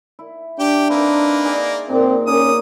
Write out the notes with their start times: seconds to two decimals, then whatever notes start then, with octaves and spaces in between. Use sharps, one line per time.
0.19 E4
0.59 D4 G4 G5
0.90 A#3 C4 D#4 B4
1.45 G#4 D5 E5
1.89 A#2 C4 D#4
2.27 A#3 C#4 D#6